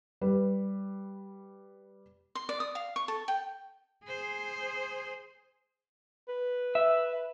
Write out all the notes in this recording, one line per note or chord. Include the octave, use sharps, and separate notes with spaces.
G3 B4
C6
D5
D#6
F5
C#6
A4
G5
G#4 C5
B4
E5